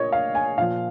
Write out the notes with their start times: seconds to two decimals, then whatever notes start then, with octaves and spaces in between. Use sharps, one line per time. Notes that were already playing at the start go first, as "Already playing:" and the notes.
Already playing: A#2 C#5 D#5
0.12 F5
0.35 G#5
0.58 A#2 F3 F5